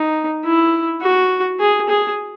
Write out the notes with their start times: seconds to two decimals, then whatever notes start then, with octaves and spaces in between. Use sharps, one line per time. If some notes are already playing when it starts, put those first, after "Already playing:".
Already playing: D#4
0.44 E4
1.01 F#4
1.60 G#4
1.89 G#4